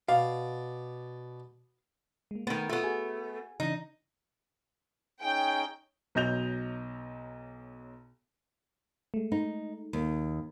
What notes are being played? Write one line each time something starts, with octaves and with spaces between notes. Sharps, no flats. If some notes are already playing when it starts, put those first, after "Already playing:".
B2 D5 F5
G#3 A#3
D#3 A3 B3
A3 B3 F4
F#4 G#4 G#5
C#3 E3 D4 D#4
C#4 D#4 G#4 G5
B1 F#3 D#5 G6 F7
G#3 A3
D#4
D#2